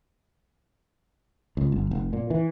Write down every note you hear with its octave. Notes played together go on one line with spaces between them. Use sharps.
C#2
G1
F1
A#2
E3